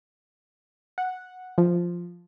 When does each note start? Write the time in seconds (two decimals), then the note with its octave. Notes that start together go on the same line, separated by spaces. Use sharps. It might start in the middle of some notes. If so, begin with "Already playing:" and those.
0.98 F#5
1.58 F3